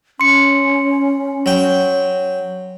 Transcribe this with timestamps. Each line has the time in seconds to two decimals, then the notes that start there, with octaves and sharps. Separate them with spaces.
0.20 C#4 C6 C#7
1.46 F#3 G5